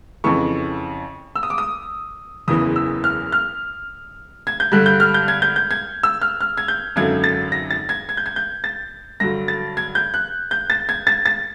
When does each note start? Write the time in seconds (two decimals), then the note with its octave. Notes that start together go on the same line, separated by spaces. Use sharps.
0.24 F2 C#3 E3 C#6
1.36 E6
1.43 D#6
1.50 D6
1.58 D#6
2.48 F#1 E2 C#3 E3 D#6
2.76 E6
3.04 F6
3.32 F6
4.47 G#6
4.60 G6
4.72 G2 D3 G3 F#6
4.86 G6
5.00 F6
5.14 G6
5.28 G#6
5.42 G6
5.56 G6
5.71 G#6
6.03 E6
6.22 F6
6.41 F6
6.57 G#6
6.68 G6
6.96 G#1 F#2 D3 F#3 G#6
7.24 A6
7.52 A#6
7.71 A6
7.89 G#6
8.09 G#6
8.17 G6
8.26 G#6
8.36 G6
8.64 A6
9.20 G2 D3 F#3 A#6
9.48 A6
9.77 G#6
9.95 G6
10.14 F#6
10.51 G6
10.70 A6
10.89 G#6
11.07 A6
11.26 A6